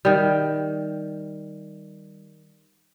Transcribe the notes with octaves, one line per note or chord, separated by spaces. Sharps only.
D#3 G3